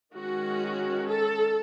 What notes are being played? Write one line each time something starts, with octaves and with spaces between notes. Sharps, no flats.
D#3 G#3 C#4 F#4
A4